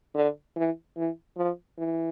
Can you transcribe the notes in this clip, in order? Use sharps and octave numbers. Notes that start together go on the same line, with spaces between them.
D3
E3
E3
F3
E3